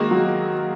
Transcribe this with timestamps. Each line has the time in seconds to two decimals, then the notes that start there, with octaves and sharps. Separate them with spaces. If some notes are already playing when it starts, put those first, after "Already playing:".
Already playing: D#3 G#3 A#3 F#4
0.11 F#3